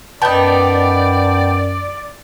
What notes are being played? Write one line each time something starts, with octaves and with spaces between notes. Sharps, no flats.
F#2 B3 D#4 D5 G5 A5